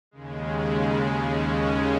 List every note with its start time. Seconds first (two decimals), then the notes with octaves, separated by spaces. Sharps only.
0.11 D#2 C#3 G#3
1.11 D#2 C#3 G#3 C#4